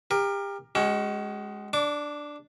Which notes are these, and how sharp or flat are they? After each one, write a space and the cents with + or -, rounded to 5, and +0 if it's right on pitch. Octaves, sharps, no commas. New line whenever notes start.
G4 +30 A#4 +0
G#3 +0 C#4 +0 F#4 +40
D4 +0 D6 -30